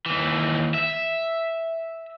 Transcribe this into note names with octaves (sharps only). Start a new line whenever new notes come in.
D#2 E3
E5